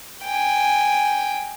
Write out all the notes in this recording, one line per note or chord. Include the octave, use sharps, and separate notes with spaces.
G5 G#5